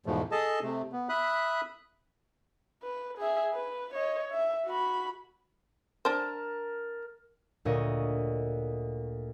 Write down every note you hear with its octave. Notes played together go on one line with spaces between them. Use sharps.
E2 G#2 B2 F3 A3
G#4 A4 D#5 A5
C3 A3
B3
E5 B5 D#6 F#6
B4
G#4 E5
B4
C#5 D#5
E5
F#4 B5
D4 A#4 C5 A5
D2 A#2 C#5 D#5